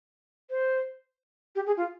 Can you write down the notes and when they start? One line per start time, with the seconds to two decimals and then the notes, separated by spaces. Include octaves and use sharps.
0.50 C5
1.55 G4
1.67 G#4
1.77 F4